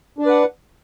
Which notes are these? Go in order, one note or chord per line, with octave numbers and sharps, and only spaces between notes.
D4 B4 D5 F#5